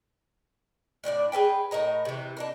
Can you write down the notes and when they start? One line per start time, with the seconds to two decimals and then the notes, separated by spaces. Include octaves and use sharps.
1.04 A2 D4 E4 D5
1.32 G#4 A4 B4 G5
1.71 A2 A#4 D#5 A#5
2.05 C3 E3
2.37 D4 D#4 A#4